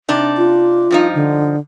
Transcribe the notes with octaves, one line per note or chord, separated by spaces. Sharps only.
C3 D4 D#4
F4
G2 F3 D#4
D3